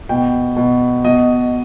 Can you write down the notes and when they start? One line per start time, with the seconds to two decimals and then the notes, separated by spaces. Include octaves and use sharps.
0.09 B2 G5
0.56 B2
1.05 B2 D#5